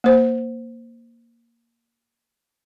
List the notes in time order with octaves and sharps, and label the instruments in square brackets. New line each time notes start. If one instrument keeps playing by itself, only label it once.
[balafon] A#3 C5